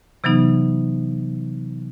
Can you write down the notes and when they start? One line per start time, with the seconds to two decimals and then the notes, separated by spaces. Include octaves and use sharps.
0.24 C3 E3 F#3 B3 D#4